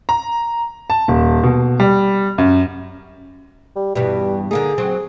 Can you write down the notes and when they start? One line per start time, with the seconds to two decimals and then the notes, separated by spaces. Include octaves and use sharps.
0.09 A#5
0.90 A5
1.08 D#1
1.43 B2
1.80 G3
2.38 F#2
3.76 G3
3.96 E2 G2 B2 G3
4.51 D3 A#3 D#4 G#4
4.78 F#3 C4 F#4